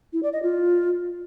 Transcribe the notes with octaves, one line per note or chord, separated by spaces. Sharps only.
E4
D5
D#5
F4